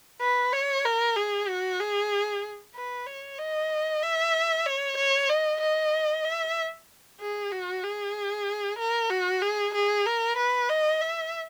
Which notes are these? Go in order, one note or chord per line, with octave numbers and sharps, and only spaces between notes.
B4
C#5
A#4
G#4
F#4
G#4
B4
C#5
D#5
E5
C#5
C#5
D#5
D#5
E5
G#4
F#4
G#4
A#4
F#4
G#4
G#4
A#4
B4
D#5
E5